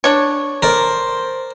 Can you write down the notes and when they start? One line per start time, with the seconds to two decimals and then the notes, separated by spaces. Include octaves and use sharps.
0.04 D4 C#5
0.62 A#4 C5 D5